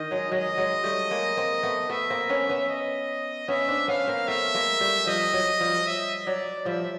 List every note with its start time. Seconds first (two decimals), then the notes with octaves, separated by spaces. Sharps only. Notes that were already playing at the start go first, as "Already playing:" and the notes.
Already playing: D#3 D#5
0.11 F#3 G#3
0.32 F#3 G#3 D#5
0.58 F#3 G#3
0.84 G3 A3
1.11 G#3 A#3
1.37 A#3 C4
1.63 A3 B3
1.89 A3 B3 E5
2.10 A#3 C4
2.29 B3 C#4
2.49 B3 C#4
2.69 D#5
3.48 B3 C#4 E5
3.68 C4 D4
3.88 B3 C#4 F5
4.07 A#3 C4
4.28 A3 B3 E5
4.54 G#3 A#3
4.81 G3 A3
5.07 F3 G3 D#5
5.33 F#3
5.60 F3 G3
5.87 E5
6.26 F#3 D5
6.65 F3 G3 E5